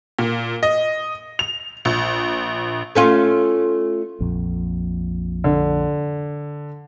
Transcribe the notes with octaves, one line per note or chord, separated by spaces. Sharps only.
A#2
D#5
F7
A#1
A3 C#4 F4
A#1 F2
D3